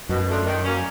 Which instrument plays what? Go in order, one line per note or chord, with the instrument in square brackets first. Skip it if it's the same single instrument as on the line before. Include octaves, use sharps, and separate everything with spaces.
[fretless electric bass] F#2 [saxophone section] B2
[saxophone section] F#3 A3 D4 F4
D#3
F#3 A#3 C#4